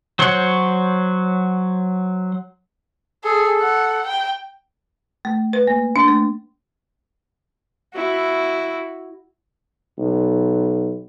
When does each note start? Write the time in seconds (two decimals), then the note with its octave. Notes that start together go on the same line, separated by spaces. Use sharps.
0.19 F#3 C5 C#5 F#5
3.24 G#4 A4
3.61 F#5
4.07 G5
5.25 A3
5.53 B4
5.67 A#3
5.96 D4
6.08 A3
7.93 E4 F#4
9.98 B1